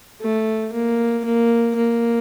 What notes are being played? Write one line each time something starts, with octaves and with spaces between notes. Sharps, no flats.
A3
A#3
A#3
A#3